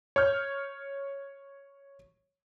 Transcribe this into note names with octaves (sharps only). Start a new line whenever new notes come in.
C#5 C#6 F6 G6